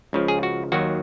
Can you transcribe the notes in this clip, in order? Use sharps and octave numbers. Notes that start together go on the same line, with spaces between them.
C#2 C#3 F3
G#4
F#4
D#2 D#3 F#3 F#4